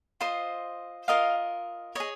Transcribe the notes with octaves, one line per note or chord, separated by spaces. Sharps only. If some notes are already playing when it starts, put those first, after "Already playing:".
F4 C5 D#5
F4 A#4 D#5 F5
G#4 C#5 D#5